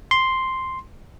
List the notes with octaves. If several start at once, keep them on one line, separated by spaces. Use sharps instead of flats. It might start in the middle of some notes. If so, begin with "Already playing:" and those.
C6